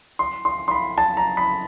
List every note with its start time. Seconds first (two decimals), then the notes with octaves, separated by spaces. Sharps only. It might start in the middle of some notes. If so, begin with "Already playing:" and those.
0.19 C6
0.45 C6
0.68 C6
0.71 B5
0.98 A5
1.17 A#5
1.37 B5